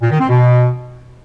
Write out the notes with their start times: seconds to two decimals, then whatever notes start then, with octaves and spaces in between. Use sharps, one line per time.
0.02 A#2
0.11 D#3
0.20 C4
0.29 B2